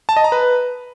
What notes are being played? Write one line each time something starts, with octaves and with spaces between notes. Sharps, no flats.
A5
D#5
A#5
B4